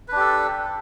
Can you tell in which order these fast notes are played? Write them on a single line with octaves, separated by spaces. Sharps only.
B4 D4 G4 A4